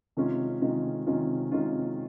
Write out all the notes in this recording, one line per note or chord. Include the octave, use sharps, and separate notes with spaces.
C3 D#3 G#3 C#4 F4
C3 D#3 G#3 C#4 F4
C3 D#3 G#3 C#4 F4
C3 D#3 G#3 C#4 F4